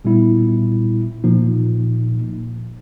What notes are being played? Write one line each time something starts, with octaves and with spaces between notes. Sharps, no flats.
A#2 G3 B3 E4
A#2 F3 A#3 D#4